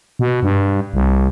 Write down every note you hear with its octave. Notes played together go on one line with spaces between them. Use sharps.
B2
G2
C2